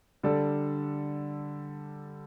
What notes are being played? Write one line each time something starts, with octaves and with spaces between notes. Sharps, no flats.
D3 G3 D4 A4